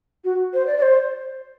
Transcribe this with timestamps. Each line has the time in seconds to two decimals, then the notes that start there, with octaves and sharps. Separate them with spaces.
0.24 F#4
0.54 C5
0.67 D5
0.77 D5
0.82 C5